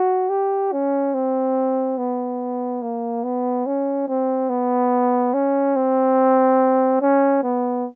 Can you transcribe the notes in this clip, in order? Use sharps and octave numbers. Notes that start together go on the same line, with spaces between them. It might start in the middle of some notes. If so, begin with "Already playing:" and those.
Already playing: F#4
G4
C#4
C4
B3
A#3
B3
C#4
C4
B3
C#4
C4
C#4
B3